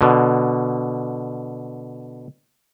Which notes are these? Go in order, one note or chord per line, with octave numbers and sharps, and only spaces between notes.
B2 D3